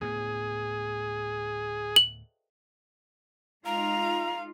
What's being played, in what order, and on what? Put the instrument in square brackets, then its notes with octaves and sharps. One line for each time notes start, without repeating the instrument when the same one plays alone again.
[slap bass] D2 A2 B3 [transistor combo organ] G#4
[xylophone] F#7
[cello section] G#3 D#4 F4 [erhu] F5 [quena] A#5